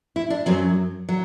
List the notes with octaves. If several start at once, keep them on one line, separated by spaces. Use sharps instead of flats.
E4
D4
F#2 F#3 C4
F#3